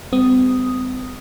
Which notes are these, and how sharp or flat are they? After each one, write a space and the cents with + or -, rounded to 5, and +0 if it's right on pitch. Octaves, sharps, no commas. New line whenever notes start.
G3 +35 C4 -45 D#6 +0